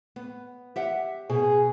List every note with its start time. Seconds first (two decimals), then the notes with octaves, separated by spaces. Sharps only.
0.16 B3
0.76 G4 E5 F#5
1.30 B2 G#4